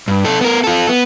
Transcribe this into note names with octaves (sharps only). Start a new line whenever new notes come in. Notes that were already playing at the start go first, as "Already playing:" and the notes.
G2
D#4 A4
B3 A#4
F4 A4
B3